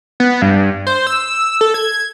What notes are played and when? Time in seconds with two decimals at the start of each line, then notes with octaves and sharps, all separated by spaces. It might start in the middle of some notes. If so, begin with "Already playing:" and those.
0.20 B3
0.42 G2
0.87 C5
1.07 E6
1.61 A4
1.74 G#6